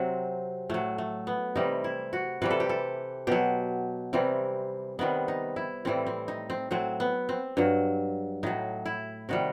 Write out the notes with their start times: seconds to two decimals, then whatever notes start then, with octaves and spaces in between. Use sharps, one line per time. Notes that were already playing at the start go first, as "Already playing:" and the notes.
Already playing: C3 F#3 C4
0.70 A2 F#3 A3
0.98 A3
1.27 B3
1.56 C3 E3 G3 D#4
1.84 E4
2.13 F#4
2.42 C3 E3 G3 B4
2.51 A4
2.60 G4
2.69 A4
3.27 B2 F#3 G4
4.13 C3 E3 G3 C4
4.99 C3 D#3 G3 B3
5.28 D#4
5.56 E4
5.85 A2 E3 G3 C4
6.06 C4
6.28 D#4
6.50 C4
6.71 A2 F#3 C4
7.00 B3
7.29 C4
7.57 G2 F#3
8.43 A2 F#3 D#4
8.86 E4
9.29 C3 D#3 G3 F#4